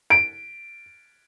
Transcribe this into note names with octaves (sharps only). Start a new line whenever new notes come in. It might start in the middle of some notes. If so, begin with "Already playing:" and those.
D7